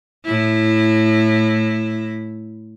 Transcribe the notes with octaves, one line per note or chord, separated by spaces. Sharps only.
A2 E4